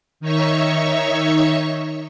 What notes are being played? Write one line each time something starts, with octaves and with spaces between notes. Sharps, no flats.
D#3 D#4 C#5 E5 C#6